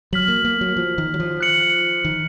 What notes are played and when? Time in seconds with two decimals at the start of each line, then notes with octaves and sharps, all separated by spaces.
0.13 F#3 F6 B6 F#7
0.28 A#3
0.45 A#3
0.61 F#3
0.77 F3
0.98 D#3
1.14 F#3
1.20 F3
1.40 F#6 C#7 F#7
2.05 D#3